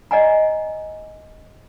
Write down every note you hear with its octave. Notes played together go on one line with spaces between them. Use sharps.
D5 D#5 F#5 G#5 A#5